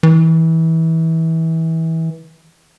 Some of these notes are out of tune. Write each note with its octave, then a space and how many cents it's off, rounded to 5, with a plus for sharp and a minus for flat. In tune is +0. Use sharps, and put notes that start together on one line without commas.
E3 -25